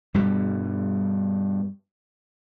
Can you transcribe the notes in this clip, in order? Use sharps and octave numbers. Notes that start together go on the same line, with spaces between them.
G2 B2 G3